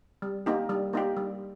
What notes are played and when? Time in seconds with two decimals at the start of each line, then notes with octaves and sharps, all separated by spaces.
0.22 G3
0.46 A#3 D#4 G4
0.69 G3
0.93 A#3 D#4 G4
1.17 G3